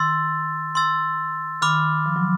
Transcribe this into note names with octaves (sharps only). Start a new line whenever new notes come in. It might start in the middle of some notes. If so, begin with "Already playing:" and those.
Already playing: D#3 C6 E6 A6
C6 E6 A6
D#3 B5 D6 F6
F3
F#3